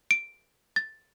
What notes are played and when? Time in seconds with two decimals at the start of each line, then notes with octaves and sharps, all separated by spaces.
0.11 D7
0.76 A6